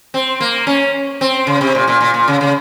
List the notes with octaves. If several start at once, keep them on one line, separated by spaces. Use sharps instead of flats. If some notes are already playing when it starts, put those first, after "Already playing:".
C4
A#3
C#4
C4
C#3
C3
A#2
A#2
A#2
A#2
C#3
C#3